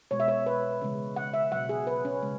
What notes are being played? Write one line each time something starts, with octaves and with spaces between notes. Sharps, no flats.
B2 G#3 C#5
E5
C#5
B4
C#3 E3 G#3
F#5
E5
B2 F#3 F#5
G#4
B4
C#4
C#3 G#3